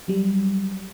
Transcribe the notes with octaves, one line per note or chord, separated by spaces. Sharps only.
F#3 G3